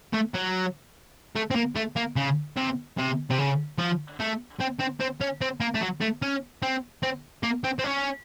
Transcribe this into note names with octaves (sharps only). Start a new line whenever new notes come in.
A3
F#3
A3
C4
A#3
A3
A#3
C#3
C3
C3
C3
C#3
F3
A3
C4
C4
C4
C#4
C4
A#3
A3
F#3
A3
C#4
C4
C4
A#3
C4
C4
C#4